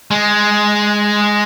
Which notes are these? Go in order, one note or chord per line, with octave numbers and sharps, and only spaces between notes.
G#3